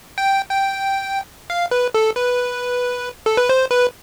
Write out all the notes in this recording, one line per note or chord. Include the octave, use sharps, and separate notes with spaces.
G5
G5
F5
B4
A4
B4
A4
B4
C5
B4